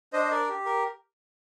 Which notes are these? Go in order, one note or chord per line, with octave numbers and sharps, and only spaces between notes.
D4 C5 D#5
D#5
A#4 D5
G4
A#4